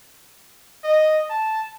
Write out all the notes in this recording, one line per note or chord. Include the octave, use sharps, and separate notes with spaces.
D#5
A5